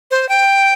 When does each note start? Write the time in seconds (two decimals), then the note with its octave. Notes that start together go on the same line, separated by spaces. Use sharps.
0.11 C5
0.29 G5